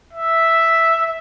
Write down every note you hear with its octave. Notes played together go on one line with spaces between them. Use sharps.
E5